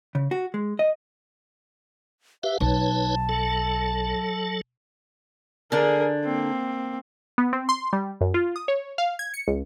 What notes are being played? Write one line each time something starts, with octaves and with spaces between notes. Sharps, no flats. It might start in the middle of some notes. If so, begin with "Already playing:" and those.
C#3
F#4
G#3
D#5
G4 B4 E5 F5
B1 D#4 B4 C#5 A5
F#3 A4
D3 D4 G#4 A#4
A#3 C4
B3
C4
C6
G3
F#2
F4
D#6
C#5
F5
G#6
C#7
C#2